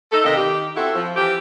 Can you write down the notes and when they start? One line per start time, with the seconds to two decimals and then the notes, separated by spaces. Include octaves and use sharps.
0.12 D#4 A4
0.24 C3 D#3 A#3 D4 D#5
0.36 D#3 G4
0.76 C4 E4 F#4 A4
0.95 F3
1.16 E3 F3 C4 G4